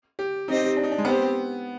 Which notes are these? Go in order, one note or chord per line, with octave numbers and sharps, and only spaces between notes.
G4
C4 D#4 G4 C5 D#5
D4
D#4
D4
G#3
B3 C4 G4 C5